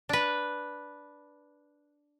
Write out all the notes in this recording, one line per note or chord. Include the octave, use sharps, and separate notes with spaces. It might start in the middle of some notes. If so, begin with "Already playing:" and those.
D4 B4